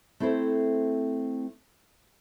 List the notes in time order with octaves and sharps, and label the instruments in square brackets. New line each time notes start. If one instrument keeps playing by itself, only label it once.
[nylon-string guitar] A3 C4 E4 A4 C5